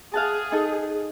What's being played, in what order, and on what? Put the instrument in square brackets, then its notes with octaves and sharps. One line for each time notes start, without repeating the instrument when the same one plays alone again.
[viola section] G#4 [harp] F5 F#5 A5
[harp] D#4 A4